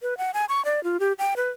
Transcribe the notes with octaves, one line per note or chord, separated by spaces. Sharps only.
B4
F#5
G#5
C#6
D5
F4
G4
G5
B4